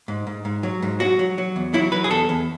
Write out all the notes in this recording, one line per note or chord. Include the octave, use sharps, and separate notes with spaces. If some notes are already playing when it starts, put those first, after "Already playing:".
G#2
G#2
G#2
F#3
G#2
F#3 F#4
F#3
F#3
E2
F#3 E4
F#3 B4
G#4
E2 A4
E2